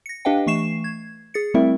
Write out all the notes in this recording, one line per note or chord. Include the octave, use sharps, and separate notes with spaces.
A#6 C#7
D4 G4 B4 D#5 F5 G5
E3 A3 C#6 C7 E7
G#6
G#4 A6 C#7
G3 A3 C4 E4 A#4 E5